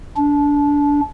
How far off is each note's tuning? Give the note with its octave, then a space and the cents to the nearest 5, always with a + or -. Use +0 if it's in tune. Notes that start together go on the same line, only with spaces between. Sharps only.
D4 -20